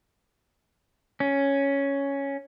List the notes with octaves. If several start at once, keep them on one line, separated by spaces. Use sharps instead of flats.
C#4